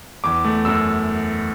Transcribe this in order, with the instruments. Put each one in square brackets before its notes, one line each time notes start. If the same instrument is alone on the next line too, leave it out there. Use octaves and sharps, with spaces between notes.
[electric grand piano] E2 D6
A3
F#2 E6